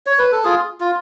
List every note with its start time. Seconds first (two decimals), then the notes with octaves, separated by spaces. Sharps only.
0.06 C#5
0.19 B4
0.32 A4
0.44 F4 G#4
0.80 F4